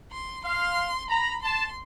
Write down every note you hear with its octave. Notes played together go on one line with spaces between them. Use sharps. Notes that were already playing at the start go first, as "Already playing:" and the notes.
C6
F5 C6
A#5 B5
A5 C6